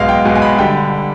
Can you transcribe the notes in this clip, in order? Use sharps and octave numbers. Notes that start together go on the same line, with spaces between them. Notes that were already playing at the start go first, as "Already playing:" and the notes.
Already playing: B1 B2 G#3 F5
G5
B1 B2 G#3 G#5
G#5
B5
D3 G3 G5